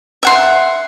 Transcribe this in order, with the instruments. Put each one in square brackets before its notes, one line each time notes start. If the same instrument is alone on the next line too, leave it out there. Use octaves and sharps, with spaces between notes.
[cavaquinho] E5 F#5 C6